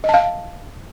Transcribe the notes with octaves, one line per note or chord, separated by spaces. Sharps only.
D#5
A5
F5